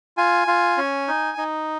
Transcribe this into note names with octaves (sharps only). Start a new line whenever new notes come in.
F4 G#5
F4
C#4
D#4
D#4